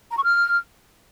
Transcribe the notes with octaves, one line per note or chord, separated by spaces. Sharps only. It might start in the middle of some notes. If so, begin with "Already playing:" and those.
A#5
C#6
F6